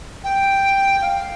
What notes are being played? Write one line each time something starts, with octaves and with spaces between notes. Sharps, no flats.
G5
F5